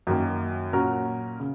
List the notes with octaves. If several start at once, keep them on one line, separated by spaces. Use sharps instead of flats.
F#2 D#3 A#3
A#2 F#3 C#4 F#4 A#4
C#3